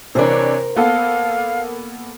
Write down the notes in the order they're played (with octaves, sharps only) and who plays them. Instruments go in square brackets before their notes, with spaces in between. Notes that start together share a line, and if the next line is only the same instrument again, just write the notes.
[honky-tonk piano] C3 E3 D4 [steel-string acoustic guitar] A#4 C5 [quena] C#5
[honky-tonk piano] A#3 B3 A4 [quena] F5